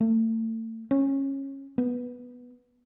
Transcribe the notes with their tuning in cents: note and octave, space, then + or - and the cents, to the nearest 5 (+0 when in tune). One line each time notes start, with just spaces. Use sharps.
A3 +35
C#4 -20
B3 -5